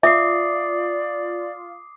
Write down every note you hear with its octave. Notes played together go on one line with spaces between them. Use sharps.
F4 D5 E5 D6 D#6 C7